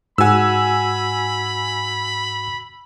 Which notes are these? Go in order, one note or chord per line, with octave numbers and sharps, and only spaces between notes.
G#2 F#4 F#5 G#5 B5 E6